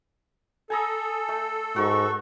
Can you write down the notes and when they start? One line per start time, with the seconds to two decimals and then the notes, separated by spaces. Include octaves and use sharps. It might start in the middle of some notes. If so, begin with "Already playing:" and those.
0.70 A4 G#5 A#5 D#6
1.28 A3
1.76 G#2 F#4 A#4 C#6